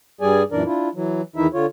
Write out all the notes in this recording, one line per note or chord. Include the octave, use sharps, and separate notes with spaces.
G2 G3 G#4 D5 G#5
F#2 A#2 E3 D4 A#4 D5
D4 E4 F4
E3 F#3
E2 D#3 E3 D#4 E4 E5
D3 F4 C#5